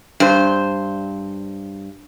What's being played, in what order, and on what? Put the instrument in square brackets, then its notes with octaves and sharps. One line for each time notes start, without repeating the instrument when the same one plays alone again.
[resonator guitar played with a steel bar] G2 C5